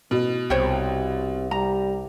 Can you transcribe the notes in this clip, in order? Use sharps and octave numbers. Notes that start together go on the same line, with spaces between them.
A1 B2
C2 C3 C5 C#5 G5
G3 A#5